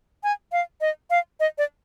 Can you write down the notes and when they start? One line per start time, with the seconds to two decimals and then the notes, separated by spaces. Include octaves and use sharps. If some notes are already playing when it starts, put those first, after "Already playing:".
0.23 G#5
0.52 F5
0.81 D#5
1.10 F5
1.40 D#5
1.58 D5